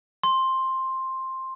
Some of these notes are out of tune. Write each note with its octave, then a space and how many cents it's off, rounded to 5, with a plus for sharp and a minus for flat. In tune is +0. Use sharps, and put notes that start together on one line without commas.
C6 +10